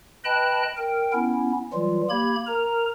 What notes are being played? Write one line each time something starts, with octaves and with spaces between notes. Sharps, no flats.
B4 D#5 G5 A5 B5 F#6
A#4 G5
B3 C#4 E4
E3 F#3 G3 F4
A#3 G4 B5 G#6
A#4 A#5